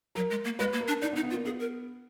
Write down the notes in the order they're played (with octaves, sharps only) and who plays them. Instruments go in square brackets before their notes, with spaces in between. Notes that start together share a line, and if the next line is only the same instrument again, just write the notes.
[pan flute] F#3 [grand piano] A#4
[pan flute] G#3
A#3
[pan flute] G#3 [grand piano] B4
[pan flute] A#3
[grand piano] A#4
[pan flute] D4
[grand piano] D4 [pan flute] D#4
[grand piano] B3
[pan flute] D#4
[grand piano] B3
[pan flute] F4
[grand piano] A#3
[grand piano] B3 [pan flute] G#4
[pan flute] A#4